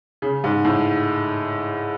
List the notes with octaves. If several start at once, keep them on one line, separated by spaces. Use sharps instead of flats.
C#3
G#2
A2